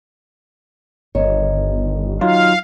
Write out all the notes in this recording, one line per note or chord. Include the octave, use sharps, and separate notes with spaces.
G1 D#3 C#5
F#3 D#4 F4 F5